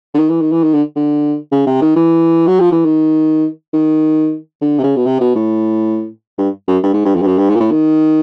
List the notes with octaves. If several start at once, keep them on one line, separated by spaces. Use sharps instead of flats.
D3
D#3
E3
D#3
E3
D#3
D3
D3
C#3
C3
D#3
E3
F#3
F3
E3
D#3
D#3
D3
C3
C#3
B2
C3
B2
A2
G2
F#2
G2
G#2
G2
F2
G2
F#2
G2
G#2
A#2
A2
D#3